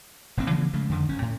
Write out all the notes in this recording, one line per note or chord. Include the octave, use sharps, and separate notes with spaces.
F1 A#1 F#2 C4
C#3 E3 F3 A#3
C#3 F3 G#3 A3
F2 D3 D#3
F#1 C#4
A2